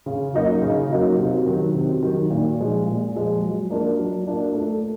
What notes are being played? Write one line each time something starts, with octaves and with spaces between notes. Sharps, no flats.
C#3
F#3 A#3 D#4 F#4
C#3
F#3 A#3 D#4 F#4
C3
D#3 F#3
C3
D#3 F#3
A#2
F3 G#3
A#2
F3 G#3
F#3
A#3 D4 F4 A#4
F#3
A#3 D4 F4 A#4
A3